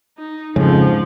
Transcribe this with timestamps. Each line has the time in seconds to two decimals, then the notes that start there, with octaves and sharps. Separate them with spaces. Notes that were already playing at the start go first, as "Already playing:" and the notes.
0.17 D#4
0.56 F2 G#2 C#3 F3